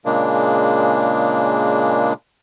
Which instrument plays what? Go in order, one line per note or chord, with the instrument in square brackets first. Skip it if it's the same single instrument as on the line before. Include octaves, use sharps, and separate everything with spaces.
[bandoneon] A#2 C#3 G#3 A#3 D4